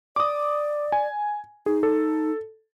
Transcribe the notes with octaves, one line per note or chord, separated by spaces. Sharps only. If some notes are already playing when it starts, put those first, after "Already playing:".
D5 D6 D#6
G#5
D#4 G#4
A4